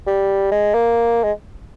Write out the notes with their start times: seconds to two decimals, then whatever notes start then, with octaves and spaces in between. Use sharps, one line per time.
0.07 G3
0.52 G#3
0.74 A#3
1.24 G#3